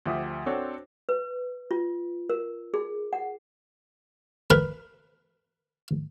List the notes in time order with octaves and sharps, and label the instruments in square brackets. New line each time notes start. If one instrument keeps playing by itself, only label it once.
[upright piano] D2 F3 G4 E5 D#6
C4 D4 F#4 A4 C5 C#5
[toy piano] B4
F4
A#4
G#4
F#5
[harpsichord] A#4 B4 B5